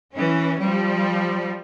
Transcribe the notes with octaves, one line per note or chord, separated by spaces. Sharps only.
E3 C#4
F3 G3